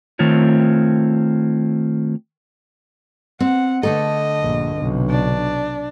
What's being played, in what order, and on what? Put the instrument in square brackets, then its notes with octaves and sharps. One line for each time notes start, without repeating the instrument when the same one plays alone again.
[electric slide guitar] D#3 A3 C4 F4 C#5
[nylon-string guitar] C4 [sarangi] F#5
[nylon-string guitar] D3 A3 A4 [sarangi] D#5
[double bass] A#1 G2
B1 C3
[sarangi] D4